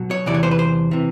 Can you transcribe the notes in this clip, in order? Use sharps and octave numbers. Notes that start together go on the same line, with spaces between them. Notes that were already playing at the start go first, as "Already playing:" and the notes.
Already playing: B2 F#3
C#5
E2 C3 E3 D5
C#5
C5
B4
C5
C3 E3